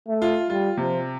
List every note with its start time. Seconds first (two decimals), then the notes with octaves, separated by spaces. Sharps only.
0.08 A3
0.22 F4
0.50 G3 F4
0.77 C3 F3